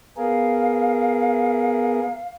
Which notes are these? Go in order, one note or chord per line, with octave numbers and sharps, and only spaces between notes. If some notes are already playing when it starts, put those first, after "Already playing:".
B3 G#4 A#4 F5